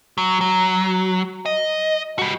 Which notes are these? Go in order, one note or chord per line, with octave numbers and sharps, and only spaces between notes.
F#3
F#3
D#5
G3 F#4